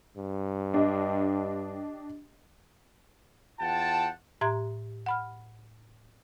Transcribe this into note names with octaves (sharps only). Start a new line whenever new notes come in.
G2
D4 G4 D#5
E2 F4 F#5 G5 A5
A2 G4 E5 A#5 C6 G#6
F#5 B5 F6